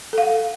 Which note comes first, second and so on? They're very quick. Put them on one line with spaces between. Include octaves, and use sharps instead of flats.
A4 F5 F#5